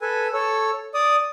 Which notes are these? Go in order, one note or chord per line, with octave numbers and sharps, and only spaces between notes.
A4 B4 G#5
A4 C#5 E6
D5 D#6